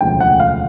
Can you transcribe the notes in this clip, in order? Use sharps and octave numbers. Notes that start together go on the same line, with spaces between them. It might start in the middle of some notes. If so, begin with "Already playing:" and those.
E1 D2 C#3 F3 G5
F#5
F5